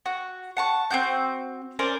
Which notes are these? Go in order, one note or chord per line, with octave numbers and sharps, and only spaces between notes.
F#4
F#5 A5 C#6
C4 E4 F#4 G6
C#4 A#4 C5 D5